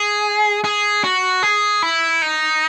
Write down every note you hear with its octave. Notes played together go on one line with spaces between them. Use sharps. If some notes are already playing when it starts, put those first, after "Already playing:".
Already playing: G#4
G#4
F#4
G#4
E4
D#4